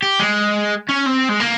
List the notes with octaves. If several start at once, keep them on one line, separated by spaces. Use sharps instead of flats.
G4
G#3
C#4
C4
G#3
A#3